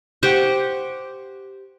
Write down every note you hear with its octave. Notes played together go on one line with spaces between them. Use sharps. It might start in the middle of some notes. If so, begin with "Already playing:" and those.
G4 C5 F#5 C#6